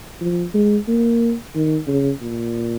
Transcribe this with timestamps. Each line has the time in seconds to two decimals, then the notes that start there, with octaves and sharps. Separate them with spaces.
0.21 F3
0.54 G#3
0.88 A#3
1.55 D#3
1.88 C#3
2.22 A#2